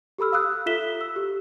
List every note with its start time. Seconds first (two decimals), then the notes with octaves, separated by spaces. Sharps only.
0.18 G4 A4 B5 E6 F6
0.32 F5 D#6 E6 F#6
0.66 F4 A4 E5 B6 E7 G7
1.01 E6
1.16 G4